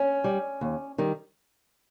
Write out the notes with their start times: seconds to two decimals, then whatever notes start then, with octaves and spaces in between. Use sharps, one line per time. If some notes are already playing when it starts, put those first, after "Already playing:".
Already playing: C#4
0.24 G3
0.61 D#2
0.98 D#3 G3